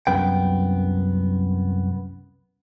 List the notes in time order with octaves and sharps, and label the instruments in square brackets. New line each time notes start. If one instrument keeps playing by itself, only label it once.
[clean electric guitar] C2 F#2 B3 G5